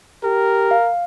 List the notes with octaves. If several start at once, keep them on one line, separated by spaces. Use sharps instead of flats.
G4 A#4
F5